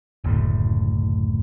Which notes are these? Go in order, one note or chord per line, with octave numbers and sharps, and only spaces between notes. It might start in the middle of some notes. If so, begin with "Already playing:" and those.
F#1 D2 A2